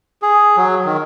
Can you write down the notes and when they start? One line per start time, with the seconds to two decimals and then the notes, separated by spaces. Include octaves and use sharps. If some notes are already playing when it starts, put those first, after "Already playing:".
0.22 G#4
0.57 F#3
0.85 D#3